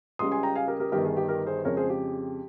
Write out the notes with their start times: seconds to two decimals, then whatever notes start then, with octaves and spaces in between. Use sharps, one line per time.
0.19 C#2 C#3 G3 C6 D#6
0.31 G#5 C6
0.43 G5 A#5
0.55 F5 G#5
0.68 G4 A#4
0.80 G4 A#4
0.92 G1 G2 D#3 G4 A#4
1.05 G#4
1.17 G4
1.28 G4 A#4
1.47 G#4 C5
1.65 F2 C#3 G#3 A#4 C#5
1.77 G#4 C5
1.90 G4